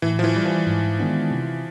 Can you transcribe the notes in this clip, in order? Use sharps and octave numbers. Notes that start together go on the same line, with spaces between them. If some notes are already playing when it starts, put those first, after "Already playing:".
A2 E3
F3
E3
E3 G3
F3
G#2
D#3 G#3 B3 D4
C3